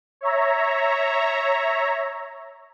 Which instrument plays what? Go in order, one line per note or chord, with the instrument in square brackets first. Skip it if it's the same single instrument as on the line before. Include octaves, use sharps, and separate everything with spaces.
[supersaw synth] C#5 E5 A#5